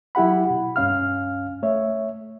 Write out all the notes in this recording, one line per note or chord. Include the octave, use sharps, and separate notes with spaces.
F#3 E4 G4 F#5 B5
B2
C#2 G2 C#4 F5 F6
A3 C#5 E5